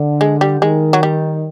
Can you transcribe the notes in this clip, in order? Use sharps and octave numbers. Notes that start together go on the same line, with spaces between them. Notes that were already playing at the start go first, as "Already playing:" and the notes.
Already playing: D3
G#3
G3
D#3 G#3
F#3
G3